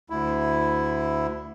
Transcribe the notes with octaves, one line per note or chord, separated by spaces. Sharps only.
D2 E4